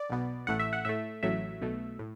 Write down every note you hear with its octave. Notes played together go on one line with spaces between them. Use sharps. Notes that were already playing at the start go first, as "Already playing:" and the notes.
Already playing: D5
B1 B2 B3
A1 A2 A3 F#5
E5
F#5
A2 A3 E5
A1 A2 F#3 A3 E5
B1 B2 A3
A2